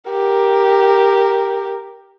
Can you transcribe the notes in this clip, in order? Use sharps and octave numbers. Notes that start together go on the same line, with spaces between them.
G4 A#4